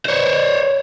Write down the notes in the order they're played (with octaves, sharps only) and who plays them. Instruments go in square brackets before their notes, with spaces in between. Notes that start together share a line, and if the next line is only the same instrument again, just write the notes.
[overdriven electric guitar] C5 C#5